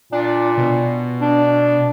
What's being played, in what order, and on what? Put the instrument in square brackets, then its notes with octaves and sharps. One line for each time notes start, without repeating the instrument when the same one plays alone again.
[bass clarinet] A#2 [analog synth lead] D4
[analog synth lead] B2
[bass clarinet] D4